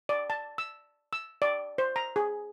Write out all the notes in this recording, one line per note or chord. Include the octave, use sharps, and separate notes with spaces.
D5
A5
E6
E6
D5
C5
A#5
G#4